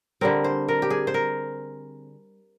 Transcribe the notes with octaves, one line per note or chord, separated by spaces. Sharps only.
D3 G3 C4 A#4
C5
A#4
G4
G#4
C5
A#4